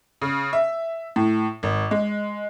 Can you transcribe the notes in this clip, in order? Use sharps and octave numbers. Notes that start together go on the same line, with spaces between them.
C#3
E5
A2
G#1
G#3